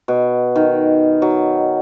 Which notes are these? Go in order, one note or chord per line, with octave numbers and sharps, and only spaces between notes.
B2
D#3
F#3